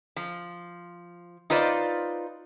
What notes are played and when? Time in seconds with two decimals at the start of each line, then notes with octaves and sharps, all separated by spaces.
0.16 F3
1.50 D#4 F4 B4 C5 D5